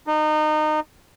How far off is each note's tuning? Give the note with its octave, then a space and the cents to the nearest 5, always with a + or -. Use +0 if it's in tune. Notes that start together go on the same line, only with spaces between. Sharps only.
D#4 -25